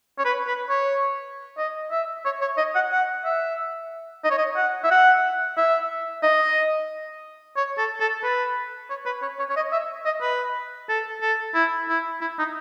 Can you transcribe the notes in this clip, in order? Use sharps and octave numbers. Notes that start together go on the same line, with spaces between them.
C#5
B4
B4
C#5
D#5
E5
C#5
C#5
D#5
F#5
F#5
E5
D#5
C#5
D#5
F#5
E5
F#5
E5
D#5
C#5
A4
A4
B4
C#5
B4
C#5
C#5
C#5
D#5
E5
D#5
B4
A4
A4
E4
E4
E4
D#4